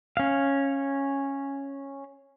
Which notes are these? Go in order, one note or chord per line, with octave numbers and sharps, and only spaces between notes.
C#4 F5